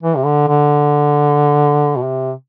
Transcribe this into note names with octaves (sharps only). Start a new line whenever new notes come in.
E3
C3
D3
D3
B2
C3